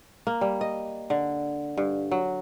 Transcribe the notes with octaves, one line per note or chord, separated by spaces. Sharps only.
A#3
G3
D#5
D3
G2
F#3